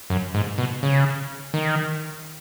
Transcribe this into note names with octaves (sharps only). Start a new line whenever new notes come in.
F#2
G#2
B2
C#3
D#3